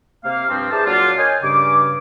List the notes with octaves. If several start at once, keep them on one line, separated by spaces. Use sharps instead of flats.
C3 A#3 F5
G2 F3 C4
E4 G#4 A#4 C5 D5 A5
A#2 F#3 A#3 D4 F4
A#4 C#5 D#5 G5 G#5
G2 C#3 D6